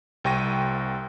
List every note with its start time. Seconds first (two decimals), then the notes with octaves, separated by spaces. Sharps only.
0.24 C2 C3 G5 C#6 A#6 D#7